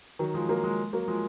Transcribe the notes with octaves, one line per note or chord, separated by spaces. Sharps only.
D#3 F#3
F3 G#3
F#3 A#3
F3 G#3
F#3 A#3
F3 G#3